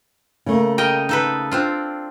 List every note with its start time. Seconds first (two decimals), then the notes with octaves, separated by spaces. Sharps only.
0.46 C#3 A3 A#3
0.78 A#4 D#5 G5
1.09 D#4 A4 B4
1.52 C4 D4 F4